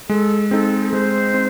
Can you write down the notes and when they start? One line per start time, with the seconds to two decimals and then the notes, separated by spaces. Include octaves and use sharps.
0.09 G#3 A4
0.51 C4 D#4 A4
0.92 G#3 C5
1.34 C4